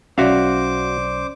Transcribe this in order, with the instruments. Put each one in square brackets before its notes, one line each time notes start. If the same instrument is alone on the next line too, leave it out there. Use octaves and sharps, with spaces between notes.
[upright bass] B1 [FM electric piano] C#4 D5 [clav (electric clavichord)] F#4 E5 F5 [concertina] C5 D6